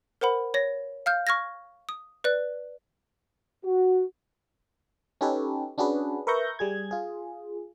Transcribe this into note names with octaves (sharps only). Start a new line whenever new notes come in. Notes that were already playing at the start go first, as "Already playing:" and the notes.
A#4 C5 F#5 B5
C#5 A#6
F5 F6 G6
C#6 F6 G#6 A#6
D#6
B4 D5 F#6
F#4
C#4 D#4 G4 A4 B4 C#5
C#4 D4 F#4 G#4 B4
A#4 B4 E5 C#6 G6 A#6
G3 G#4 G#6
F4 G#4